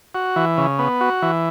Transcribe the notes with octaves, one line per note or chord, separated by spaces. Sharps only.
F#4
E3
C#3
B3
F#4
E3